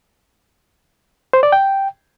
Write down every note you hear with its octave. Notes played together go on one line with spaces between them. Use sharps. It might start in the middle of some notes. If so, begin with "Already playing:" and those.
C5
D5
G5